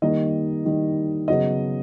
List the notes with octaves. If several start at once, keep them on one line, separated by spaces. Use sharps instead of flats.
D#3 G3 A#3 D#5
D#3 G3 A#3
C#3 F#3 B3 D#5